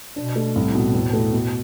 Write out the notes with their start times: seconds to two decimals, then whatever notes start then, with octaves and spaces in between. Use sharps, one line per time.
0.16 B2 D4
0.36 A3
0.55 C2 A2
0.75 B2
0.94 E2
1.13 A3
1.33 B2